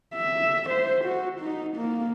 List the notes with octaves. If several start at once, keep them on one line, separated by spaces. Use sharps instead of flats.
E5
C5
F#4
D#4
A#3